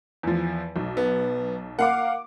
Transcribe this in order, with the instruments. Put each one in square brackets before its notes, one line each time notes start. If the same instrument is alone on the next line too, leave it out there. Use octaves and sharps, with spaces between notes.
[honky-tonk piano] E2 F3
B1
[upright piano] B3
[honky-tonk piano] A#3 F5 D6 [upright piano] F#5